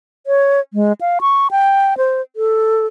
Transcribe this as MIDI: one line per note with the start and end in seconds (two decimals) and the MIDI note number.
0.27 0.60 73
0.74 0.93 56
1.01 1.19 77
1.21 1.47 85
1.51 1.97 79
1.97 2.21 72
2.36 2.87 69